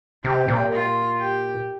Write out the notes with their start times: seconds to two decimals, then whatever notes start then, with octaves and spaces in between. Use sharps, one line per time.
0.24 C3 G4
0.48 A#2
0.72 F4
1.19 G4